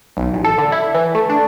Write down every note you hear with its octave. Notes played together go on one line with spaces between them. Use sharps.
B1
A1
A4
D3
E4
E3
A3
D4